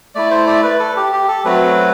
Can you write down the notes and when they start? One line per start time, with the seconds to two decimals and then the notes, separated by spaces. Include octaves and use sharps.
0.15 A3 E4 D5
0.31 C5
0.47 D5
0.63 B4
0.80 A4
0.96 G4
1.13 G4
1.28 A4
1.44 F#3 A3 C4 F#4 B4